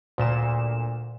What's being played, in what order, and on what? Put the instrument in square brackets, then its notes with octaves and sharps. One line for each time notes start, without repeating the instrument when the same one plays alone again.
[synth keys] D2 A#2 E7